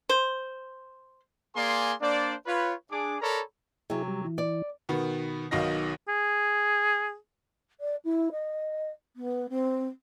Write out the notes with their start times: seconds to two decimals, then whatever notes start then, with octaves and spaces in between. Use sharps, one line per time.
0.09 C5
1.55 A#3 G#4 D5 G#5 C6
2.01 A#3 D4 C5 D5
2.46 F4 B4 C#5
2.91 D4 G#4 D6
3.21 A4 A#4 C#5 D5 A#5 B5
3.90 C3 F#3 E4 G#4
4.08 G3
4.25 E3
4.38 D5
4.89 B2 D#3 B3
5.51 B1 B2 D#3 D#5 F5 A#6
6.08 G#4
7.81 D5
8.05 E4
8.32 D#5
9.16 B3
9.49 C4